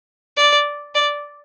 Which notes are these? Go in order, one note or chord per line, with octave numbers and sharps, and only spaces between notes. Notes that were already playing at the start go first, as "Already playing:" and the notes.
D5
D5